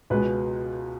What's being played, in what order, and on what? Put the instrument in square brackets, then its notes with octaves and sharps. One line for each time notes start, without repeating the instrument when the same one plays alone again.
[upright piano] C#2 B2 G#3 B4